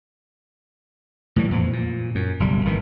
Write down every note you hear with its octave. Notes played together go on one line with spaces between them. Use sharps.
A2 E3 G3
F2 A#2 E3 F3
A#2
F#2
F#1 B1 G3
G#1 D#3 E3